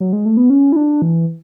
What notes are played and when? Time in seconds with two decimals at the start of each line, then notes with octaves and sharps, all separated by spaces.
0.00 F#3
0.13 G#3
0.25 A3
0.37 B3
0.50 C#4
0.72 E4
0.76 D4
1.02 E3